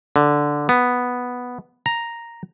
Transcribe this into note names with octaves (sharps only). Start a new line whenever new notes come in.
D3
B3
A#5